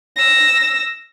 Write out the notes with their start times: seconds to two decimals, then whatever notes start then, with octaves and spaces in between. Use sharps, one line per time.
0.16 E6 A#6